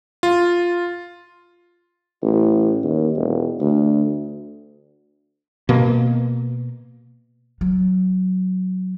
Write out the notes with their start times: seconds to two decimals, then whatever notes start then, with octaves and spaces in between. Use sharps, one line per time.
0.23 F4
2.22 A1
2.84 D#2
3.16 E1
3.60 D2
5.69 B2 A#3
7.61 F#3